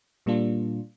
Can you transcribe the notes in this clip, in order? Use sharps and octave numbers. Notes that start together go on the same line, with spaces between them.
A#2 G3 A#3 D4 F4